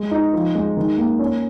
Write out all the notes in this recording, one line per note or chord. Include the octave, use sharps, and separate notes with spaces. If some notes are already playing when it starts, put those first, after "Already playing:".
Already playing: G#3 G#4
D#4
F3
G#3
D#3
A#3
C#4